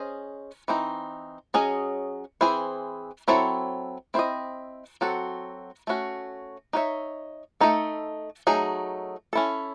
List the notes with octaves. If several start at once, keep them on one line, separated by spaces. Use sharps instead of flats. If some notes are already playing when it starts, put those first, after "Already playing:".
Already playing: C#4 G#4 C5 D#5
E3 C4 D#4
F#3 C#4 G#4 D#5
E3 C4 E4 G#4 C5
F#3 C4 E4 A4 C#5
C4 E4 C5 D#5
F#3 C4 F#4 A4
A3 C#4 F#4
D#4 F#4 C#5 E5
A3 D#4 A4
F#3 A3 D#4 G#4
C#4 E4 A4